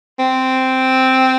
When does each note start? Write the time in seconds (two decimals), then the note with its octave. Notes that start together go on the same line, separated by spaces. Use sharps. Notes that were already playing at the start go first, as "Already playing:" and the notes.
0.19 C4